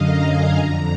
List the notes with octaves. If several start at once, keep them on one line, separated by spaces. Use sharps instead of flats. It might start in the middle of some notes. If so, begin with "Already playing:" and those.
Already playing: F#2 D3 D#5 F5 A#5
G#5
F2 D3 A#5